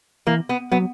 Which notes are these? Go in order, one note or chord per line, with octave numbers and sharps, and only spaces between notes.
E3 A#3
B3
F#3 B3